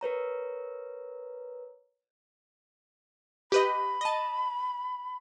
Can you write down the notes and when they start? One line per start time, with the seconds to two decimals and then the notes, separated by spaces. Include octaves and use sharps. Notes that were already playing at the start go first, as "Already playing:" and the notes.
0.01 A#4 B4 C#5 A#5
3.52 G4 B4 D#5 B5
4.01 D#5 A5